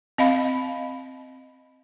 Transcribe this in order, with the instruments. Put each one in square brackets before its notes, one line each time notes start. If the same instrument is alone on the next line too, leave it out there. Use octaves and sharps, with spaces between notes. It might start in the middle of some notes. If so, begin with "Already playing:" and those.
[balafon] C4 D#5 F5 B5